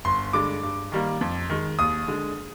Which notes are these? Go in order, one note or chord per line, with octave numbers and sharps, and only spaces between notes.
G1 C6
G2 D3 G#3 D6
G2
D#3 G3 A#3
F2
D#3 G#3
D#2 D#6
D3 G#3